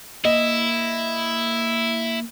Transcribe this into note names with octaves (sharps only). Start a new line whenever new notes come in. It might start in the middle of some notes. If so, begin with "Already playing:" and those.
A#3 E4 D#5